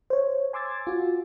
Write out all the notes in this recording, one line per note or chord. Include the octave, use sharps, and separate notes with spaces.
C5 C#5
G#5 C6 D6 E6 G#6 A6
F4 F#4